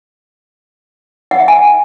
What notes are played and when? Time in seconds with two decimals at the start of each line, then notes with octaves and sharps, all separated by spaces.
1.31 F#5
1.40 E5
1.48 G#5